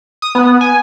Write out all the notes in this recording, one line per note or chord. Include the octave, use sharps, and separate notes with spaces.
D#6
B3
G#5